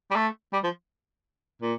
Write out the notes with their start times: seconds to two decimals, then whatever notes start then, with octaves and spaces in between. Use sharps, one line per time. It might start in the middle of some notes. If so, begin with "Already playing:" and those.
0.11 G3
0.16 A3
0.53 G3
0.64 F3
1.63 A#2